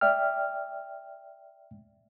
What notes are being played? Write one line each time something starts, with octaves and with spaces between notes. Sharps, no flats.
D5 E5 G5 F6